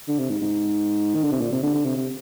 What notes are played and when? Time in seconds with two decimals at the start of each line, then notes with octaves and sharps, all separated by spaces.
0.08 D3
0.19 C3
0.30 G#2
0.41 G#2
1.15 D#3
1.23 D3
1.32 C3
1.40 A#2
1.52 C3
1.63 D3
1.74 D3
1.85 C3
1.97 C3